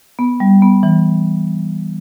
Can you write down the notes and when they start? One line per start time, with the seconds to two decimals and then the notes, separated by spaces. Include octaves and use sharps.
0.19 B3
0.40 G3
0.62 B3
0.83 E3